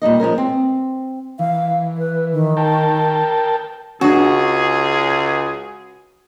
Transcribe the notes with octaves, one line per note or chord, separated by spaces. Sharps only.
A#2 G3 D#4 D#5
F3 G#3 C#4 A#4
C4
E3 F5
B4
D#3
A#4 G5 A5
C#2 C#4 D4 F#4 G#4